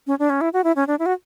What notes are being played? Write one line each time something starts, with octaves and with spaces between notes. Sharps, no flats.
C#4
D4
C#4
E4
F#4
E4
C#4
D4
E4
F#4